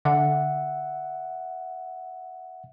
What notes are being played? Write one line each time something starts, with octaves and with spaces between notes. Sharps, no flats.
D3 E5 F#5